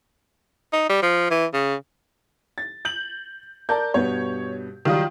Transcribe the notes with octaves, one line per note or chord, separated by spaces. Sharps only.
D#4
G3
F3
E3
C#3
A6
G6 F#7
A#4 D5 A5 G6
G2 B2 B3 C#5
D#3 F#3 G3 F4 F5 D#6